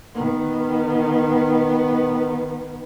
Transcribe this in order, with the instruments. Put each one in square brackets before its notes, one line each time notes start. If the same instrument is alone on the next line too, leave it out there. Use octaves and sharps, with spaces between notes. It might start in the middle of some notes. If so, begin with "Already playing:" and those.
[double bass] D#3 B3